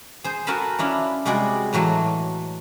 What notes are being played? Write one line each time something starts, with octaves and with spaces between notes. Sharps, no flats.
G#4 C5
F#4 A4 A#4 G#5 A5 B5
C#4 D4 E4 F4
C3 G3 G#3 F#4 G#4 D5
A2 E3 F#3 A3